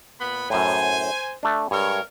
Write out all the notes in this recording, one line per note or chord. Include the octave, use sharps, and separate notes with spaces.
A#2 B3 B5
F#2 A2 C5 G#5
A3 D4
G2 G#3 A#4 C#5